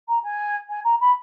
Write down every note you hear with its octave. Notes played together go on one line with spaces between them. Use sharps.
A#5
G#5
G#5
A#5
B5